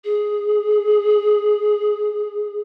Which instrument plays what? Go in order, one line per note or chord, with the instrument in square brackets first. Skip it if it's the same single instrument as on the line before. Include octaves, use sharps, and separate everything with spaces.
[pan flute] G#4